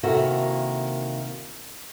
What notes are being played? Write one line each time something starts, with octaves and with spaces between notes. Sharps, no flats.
C3 D#3 A#3 E4 F#4 A4